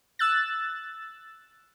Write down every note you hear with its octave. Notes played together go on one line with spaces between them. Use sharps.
E6 F#6 A6